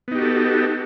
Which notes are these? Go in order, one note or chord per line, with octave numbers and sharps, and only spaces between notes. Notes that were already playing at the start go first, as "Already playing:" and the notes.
B3 D#4 F#4 G4 A4